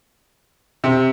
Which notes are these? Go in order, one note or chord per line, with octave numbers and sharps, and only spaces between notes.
C3